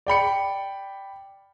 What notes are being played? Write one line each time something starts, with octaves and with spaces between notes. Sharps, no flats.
D5 G5 B5 C#7